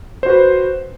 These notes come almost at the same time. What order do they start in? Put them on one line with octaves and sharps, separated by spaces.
C5 F#4 B4